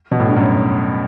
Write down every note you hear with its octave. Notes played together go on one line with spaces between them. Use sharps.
B2
A2
G2
F#2 A2